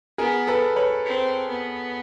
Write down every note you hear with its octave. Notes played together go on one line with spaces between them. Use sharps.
B3 G#4 A#4
A4 B4
B4 C#5
C4
B3